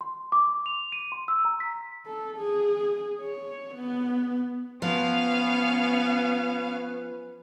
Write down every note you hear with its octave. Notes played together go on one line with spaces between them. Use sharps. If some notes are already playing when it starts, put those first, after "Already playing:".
C6
D6
F7
D#7
C6
E6
A#5
B6
A4
G#4
C#5
B3
F3 B3 C#4 B4 F5